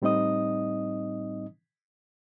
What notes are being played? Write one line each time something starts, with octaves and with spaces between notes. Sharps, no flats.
A2 G3 C4 D#4 D#5 D#6